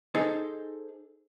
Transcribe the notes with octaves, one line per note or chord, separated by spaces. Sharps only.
D#4 G#4 A4 C5